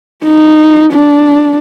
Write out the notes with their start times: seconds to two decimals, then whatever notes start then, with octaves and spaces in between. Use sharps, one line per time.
0.24 D#4
0.93 D4